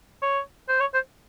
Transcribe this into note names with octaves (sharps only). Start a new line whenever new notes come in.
C#5
C5
C#5
C5